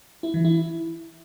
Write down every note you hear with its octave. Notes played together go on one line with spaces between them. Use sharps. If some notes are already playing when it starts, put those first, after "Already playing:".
E4
E3
E4